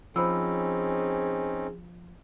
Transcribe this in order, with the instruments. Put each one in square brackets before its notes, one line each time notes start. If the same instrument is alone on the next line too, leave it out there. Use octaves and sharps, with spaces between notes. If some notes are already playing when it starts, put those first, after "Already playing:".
[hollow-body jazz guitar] F3 [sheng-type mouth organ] C4 C#4 D#4 [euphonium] G#4 [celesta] C5 B5 E6